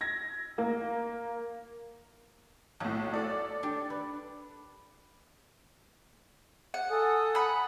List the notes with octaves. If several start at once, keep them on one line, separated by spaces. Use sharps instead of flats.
G#6 A#6
A#3
B1 A2 F#3
A4 D5
D4 G4
B4
F#5
A4 G#5 D#6
F#5 B5